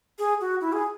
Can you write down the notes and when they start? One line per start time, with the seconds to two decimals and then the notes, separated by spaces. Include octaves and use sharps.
0.19 G#4
0.40 F#4
0.61 E4
0.72 G#4